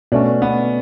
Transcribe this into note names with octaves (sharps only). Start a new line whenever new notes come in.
B2 A3 C#4 D4
B3